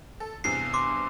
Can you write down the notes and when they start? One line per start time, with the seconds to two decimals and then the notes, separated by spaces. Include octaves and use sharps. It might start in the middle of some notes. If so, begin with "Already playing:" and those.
0.20 A4
0.44 E2 G2 C3 C7
0.74 C6 D6